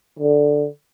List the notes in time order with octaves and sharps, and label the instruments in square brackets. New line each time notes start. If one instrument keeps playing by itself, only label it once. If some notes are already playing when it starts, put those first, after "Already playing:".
[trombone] D3